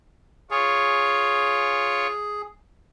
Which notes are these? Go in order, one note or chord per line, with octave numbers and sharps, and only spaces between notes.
F4 G#4 C#5